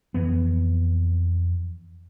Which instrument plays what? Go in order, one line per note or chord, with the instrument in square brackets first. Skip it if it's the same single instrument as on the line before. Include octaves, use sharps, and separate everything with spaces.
[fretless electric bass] F2 E3 B3